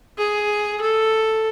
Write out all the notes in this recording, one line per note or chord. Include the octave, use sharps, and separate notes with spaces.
G#4
A4